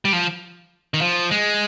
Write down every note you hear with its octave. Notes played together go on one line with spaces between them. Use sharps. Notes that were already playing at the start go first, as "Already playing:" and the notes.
G3
F3
D#3
F3
G#3